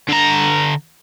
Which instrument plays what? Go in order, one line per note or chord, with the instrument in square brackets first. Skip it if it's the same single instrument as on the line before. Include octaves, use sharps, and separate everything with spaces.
[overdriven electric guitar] D3 A#5